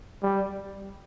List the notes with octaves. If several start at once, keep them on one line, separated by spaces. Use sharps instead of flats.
G3